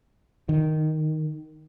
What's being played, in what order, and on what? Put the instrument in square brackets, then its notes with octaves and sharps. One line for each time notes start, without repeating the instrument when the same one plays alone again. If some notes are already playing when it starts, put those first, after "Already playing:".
[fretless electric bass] D#3